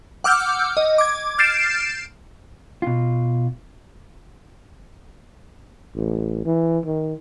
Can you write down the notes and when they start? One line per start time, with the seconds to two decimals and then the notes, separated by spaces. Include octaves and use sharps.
0.24 F#5 D6 E6 F6 G6
0.77 D#5
0.98 D6 G#6
1.38 F6 G6 A6 C7 D7 E7
2.82 B2 F4
5.96 A1
6.46 E3
6.85 D#3